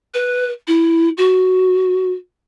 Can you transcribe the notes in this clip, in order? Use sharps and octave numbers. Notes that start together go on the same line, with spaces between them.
B4
E4
F#4